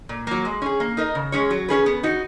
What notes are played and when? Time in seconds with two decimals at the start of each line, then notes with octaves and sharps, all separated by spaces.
0.09 A#2
0.27 F#3 A#3
0.45 G#3
0.62 C#4 G#4
0.80 A#3
0.97 D#4 A#4 D#5
1.15 C#3
1.32 G#3 C#4 G#4 C#5
1.50 F#3
1.68 C#4 G#4 B4
1.86 B3
2.03 D#4 F#4